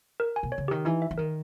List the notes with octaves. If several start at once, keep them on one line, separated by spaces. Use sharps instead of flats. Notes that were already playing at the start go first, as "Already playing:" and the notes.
A#4
G#5
B2
C#5
C#3
D#3 G4
E3 D#4
E5
E3
D#3 A#4